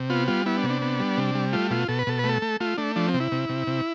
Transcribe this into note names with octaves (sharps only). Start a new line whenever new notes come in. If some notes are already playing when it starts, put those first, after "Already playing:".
Already playing: C3
B3 F4
G3 F4
B3 E4
D4
C3
D4
B3
G3
C3
G3
A3 F4
B2 F4
B2 A4
B4
B2 A4
A3 B4
A4
A3
A3 F4
A3 D4
F3 D4
C4
C3
E4
C3
C3
C3